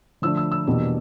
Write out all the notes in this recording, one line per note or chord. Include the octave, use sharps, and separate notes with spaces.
D3 F3 A3 D4 E6
E6
E6
E2 B2 G3 A#3 D4